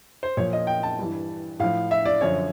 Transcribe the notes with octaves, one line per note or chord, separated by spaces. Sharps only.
C5
A#2 F3 C#5
D#5
G5
A5
G2 E3
A2 F3 F5
E5
D5
F#2 D3 F3 C#5